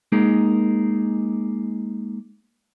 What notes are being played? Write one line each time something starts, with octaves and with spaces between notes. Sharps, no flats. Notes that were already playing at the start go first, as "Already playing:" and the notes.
G#3 A#3 D#4 G#4 A#4